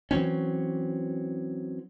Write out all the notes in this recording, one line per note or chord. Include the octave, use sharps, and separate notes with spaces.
E3 F#3 C4 C#4